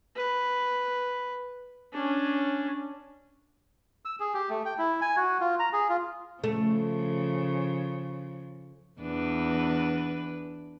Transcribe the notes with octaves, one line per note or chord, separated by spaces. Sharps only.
B4
C#4 D4
E6
G#4
G4
A3
G5
E4
G#5
F#4
F4
A#5
G#4
F4
C#3 F3 A3
E2 D4 B4